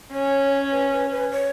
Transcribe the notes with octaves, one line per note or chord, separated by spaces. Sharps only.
C#4 C#5
B4
B4
B4
C#5